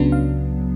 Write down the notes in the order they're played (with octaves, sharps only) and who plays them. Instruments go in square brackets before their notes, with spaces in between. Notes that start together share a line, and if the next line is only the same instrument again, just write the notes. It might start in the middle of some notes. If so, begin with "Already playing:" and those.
Already playing: [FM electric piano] C#2 C#3 F#3 B3 D4
F5